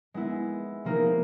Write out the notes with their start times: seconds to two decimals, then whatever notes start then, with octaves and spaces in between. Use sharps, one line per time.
0.14 G#3 B3 E4
0.85 C3 F3 A#3 D#4